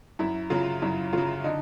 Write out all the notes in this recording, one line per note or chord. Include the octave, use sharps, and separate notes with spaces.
F#2 E4
C#3 F#3 F4
F#2 E4
C#3 F#3 F4
D3 D#4